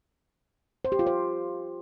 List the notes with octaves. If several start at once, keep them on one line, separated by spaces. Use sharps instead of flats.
C5
G4
F4
C5